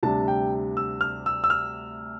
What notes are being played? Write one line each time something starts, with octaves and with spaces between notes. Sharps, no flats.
D2 C3 G3 D4 A5
G5
E6
F6
E6
E6
F6